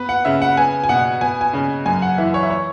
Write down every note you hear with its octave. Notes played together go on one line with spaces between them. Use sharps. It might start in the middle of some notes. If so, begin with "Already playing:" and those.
Already playing: B3 B4
F#5
C#3 E5
F#5
B3 G#5
G#5
B2 F#5
B3 G#5
G#5
C#3
F#2 G#5
F#5
E3 E5
C#5
E5
C#5